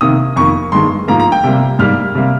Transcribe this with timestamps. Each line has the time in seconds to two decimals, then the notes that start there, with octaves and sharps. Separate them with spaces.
0.01 C3 D#3 A#3 D#6
0.36 F2 D#3 A#3 C#6
0.72 G2 D#3 G#3 C6
1.08 G#2 F3 A#3 A#5
1.20 A#5
1.32 G5
1.44 C3 G3 A#3
1.79 G#2 G3 A#3 F6
2.15 C3 G3 A#3